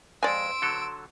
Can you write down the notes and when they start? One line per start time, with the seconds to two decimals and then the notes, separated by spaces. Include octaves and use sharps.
0.23 F2 G#3 D5 G#5 C6 E6 D7
0.62 D3 F#3 A4